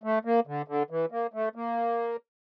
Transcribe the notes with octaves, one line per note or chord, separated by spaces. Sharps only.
A3
A#3
D3
D3
E3
A#3
A3
A#3